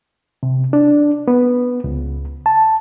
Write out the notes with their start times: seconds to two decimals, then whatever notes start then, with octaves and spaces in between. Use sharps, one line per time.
0.43 C3
0.73 D4
1.28 B3
1.84 C#2
2.46 A5